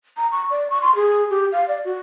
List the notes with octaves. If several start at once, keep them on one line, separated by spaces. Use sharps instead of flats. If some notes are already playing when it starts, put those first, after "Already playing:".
A#5
C#6
D5
C#6
C6
G#4
G4
F5
D5
F#4